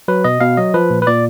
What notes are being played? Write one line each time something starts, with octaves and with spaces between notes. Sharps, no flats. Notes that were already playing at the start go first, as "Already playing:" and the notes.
F#3 B4
B2 D#5
B2 F5
F#3 D#5
F3 B4
A#2
B4
A#2 D5